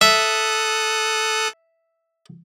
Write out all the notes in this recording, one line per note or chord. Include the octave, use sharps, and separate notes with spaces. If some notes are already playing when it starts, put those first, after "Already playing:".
A4 E5 D#6 F#6